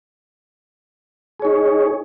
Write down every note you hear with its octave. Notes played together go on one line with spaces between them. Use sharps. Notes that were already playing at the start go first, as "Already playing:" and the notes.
D#4 G#4 C#5